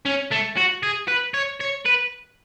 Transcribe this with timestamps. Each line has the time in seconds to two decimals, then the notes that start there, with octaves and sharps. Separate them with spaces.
0.05 C#4
0.31 A3
0.57 F#4
0.83 G#4
1.08 B4
1.34 C#5
1.60 C#5
1.85 B4